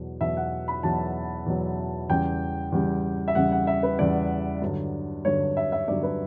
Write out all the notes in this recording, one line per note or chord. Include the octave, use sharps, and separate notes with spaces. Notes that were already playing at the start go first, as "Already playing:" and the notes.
Already playing: E2 B2 F#3
E2 B2 F#3 E5
F#5
B5
E2 B2 F#3 A5
E2 B2 F#3
E2 C#3 G3 G5
E2 C#3 G3
E5
E2 C#3 G3 F#5
F#5
E5
B4
E2 C#3 G3 D5
G2 D3 F#3
G2 D3 F#3 C#5
E5
E5
G2 D3 F#3 D5
B4